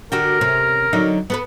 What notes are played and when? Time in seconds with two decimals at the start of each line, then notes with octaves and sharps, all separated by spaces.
0.12 D3 F#4 G4 A#4
0.41 C3 C#4
0.93 D3 F#3 D#4
1.30 B3 A4 B4